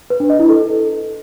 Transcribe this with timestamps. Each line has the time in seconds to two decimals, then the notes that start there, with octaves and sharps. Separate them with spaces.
0.10 B4
0.20 D4
0.30 D#5
0.39 E4
0.49 A4